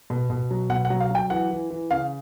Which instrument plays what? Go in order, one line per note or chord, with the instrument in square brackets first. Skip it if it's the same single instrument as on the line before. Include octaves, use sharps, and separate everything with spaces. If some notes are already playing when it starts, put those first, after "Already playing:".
[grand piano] B2
B2
F#3
B2 F#5
F#5
F#3
F5
F#3 G5
E3 F#5
E3
E3
C#3 F5